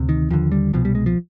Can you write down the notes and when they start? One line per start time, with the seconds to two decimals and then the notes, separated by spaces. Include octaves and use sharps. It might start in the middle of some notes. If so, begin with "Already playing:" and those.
Already playing: D2 C3
0.09 D#3
0.30 D#2 D3 F3
0.52 G3
0.73 C2 B2 F3
0.85 G3
0.95 G#3
1.06 F3